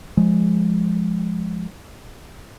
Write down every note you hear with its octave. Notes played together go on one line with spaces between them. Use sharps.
F3 G#3